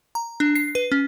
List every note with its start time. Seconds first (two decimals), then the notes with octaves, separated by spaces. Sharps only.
0.15 A#5
0.40 D4
0.55 C7
0.75 B4
0.92 C#4